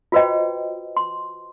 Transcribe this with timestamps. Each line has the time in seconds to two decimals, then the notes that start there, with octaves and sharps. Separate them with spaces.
0.12 F4 F#4 B4 C5 D#5 G5
0.97 C6